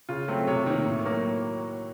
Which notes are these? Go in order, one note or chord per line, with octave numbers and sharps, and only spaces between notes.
C#3 F4
F#3 A3 C4
C3 C#5
D#3 A#3
A2
F#3 A#3